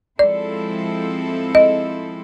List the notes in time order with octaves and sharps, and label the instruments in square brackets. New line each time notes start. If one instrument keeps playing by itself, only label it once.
[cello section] F3 G#3 C4 E4 A4 [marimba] D5
[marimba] D#5